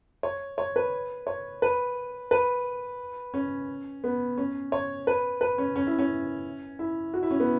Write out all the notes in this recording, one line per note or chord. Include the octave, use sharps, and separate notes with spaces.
C#5
C#5
B4
C#5
B4
B4
C#4
B3
C#4
C#5
B4
B4
C#4
C#4
E4
C#4
E4
F#4
E4
C#4
B3